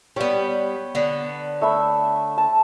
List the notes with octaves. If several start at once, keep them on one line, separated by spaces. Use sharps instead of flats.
G3 B3 C#5 G5
D3 B3
A3 E5 B5
A5